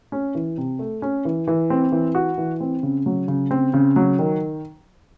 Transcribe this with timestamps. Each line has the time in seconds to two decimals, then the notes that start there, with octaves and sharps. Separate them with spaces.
0.12 C#4
0.35 E3
0.57 C3
0.79 A3
1.02 C#4
1.25 E3
1.48 E3
1.70 C4
1.92 E3
2.15 F#4
2.38 E3
2.61 C4
2.83 C#3
3.06 F#3
3.28 C#3
3.51 C4
3.74 C#3
3.96 F#3
4.19 D#3